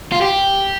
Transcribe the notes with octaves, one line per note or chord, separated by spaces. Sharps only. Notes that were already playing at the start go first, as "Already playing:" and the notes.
F4
G4